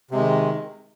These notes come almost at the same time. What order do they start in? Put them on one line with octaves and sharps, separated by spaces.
C3 G#3 D#3